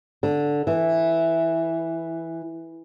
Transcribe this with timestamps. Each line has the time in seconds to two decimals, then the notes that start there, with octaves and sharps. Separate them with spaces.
0.23 D3
0.67 E3